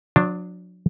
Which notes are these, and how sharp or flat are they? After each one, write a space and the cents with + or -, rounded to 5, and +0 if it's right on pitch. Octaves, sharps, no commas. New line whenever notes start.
F#3 -40 D4 +0